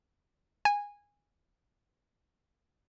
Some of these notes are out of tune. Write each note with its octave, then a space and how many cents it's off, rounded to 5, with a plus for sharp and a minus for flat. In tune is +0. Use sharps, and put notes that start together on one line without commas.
G#5 -15